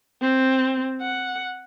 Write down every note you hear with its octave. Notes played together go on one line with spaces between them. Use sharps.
C4
F#5